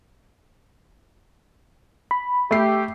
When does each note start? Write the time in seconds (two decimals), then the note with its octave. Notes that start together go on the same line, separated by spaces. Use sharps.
2.11 B5
2.51 A3 G4 C7